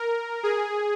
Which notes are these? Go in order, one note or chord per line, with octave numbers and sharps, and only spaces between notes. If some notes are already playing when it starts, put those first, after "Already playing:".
Already playing: A#4
G#4